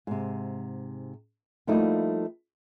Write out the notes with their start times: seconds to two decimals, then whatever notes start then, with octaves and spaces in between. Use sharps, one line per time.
0.07 G#2 C3
1.67 F3 G3 A3 A#3 D#4 E4